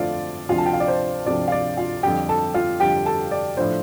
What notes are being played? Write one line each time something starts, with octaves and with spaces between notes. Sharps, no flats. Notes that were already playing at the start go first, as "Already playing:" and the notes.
Already playing: F2 D3 A3 C4 F4 D5 F5
D2 C3 F3 D4 F4 F5
A5
G5
F5
D5
C5
D2 C3 F3 D4 D5
F5
D5
F4 F5
F2 D3 G3 G4 G5
A4 A5
F4 F5
F2 D3 G3 G4 G5
A4 A5
D5
A2 F3 D4 C5